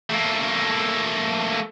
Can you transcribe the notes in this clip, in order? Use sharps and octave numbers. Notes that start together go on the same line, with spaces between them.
A3 A#3